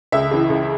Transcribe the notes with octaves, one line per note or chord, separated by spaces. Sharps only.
C#2 E5
C#3 E3
C#2